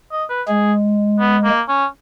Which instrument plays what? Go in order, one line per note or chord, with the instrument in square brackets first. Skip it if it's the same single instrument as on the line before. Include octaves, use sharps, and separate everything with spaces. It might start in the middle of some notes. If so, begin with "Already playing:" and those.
[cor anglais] D#5
B4
[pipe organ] G#3 [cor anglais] G#4
[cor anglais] B3
A#3
C#4